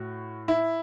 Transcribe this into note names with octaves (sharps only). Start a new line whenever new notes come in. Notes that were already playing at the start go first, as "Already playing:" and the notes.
Already playing: A2 F#4
E4